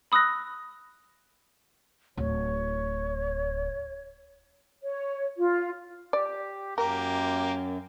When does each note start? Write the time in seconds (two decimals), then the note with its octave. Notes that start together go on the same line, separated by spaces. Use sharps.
0.12 B5 D#6 E6 F#6 A#6
2.17 D1 C#5
4.82 C#5
5.37 F4
6.13 G4 D5
6.78 F#2 A#3 G4 A#4